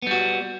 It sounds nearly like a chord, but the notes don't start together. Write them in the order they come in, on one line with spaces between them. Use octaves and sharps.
B3 G3 F#4